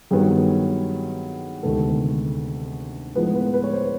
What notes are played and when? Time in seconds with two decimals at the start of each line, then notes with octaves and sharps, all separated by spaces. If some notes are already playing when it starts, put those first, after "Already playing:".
0.11 G2 D#3 F#3 B3 G#4
1.63 D2 C3 D#3 G#3 B3 A4
3.15 A2 F3 G#3 B3 B4
3.35 B4
3.54 B4
3.64 C#5
3.73 C5